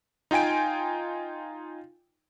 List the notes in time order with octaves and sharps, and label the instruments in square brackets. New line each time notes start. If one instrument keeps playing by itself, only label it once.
[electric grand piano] D#4 F4 G5 G#5 D7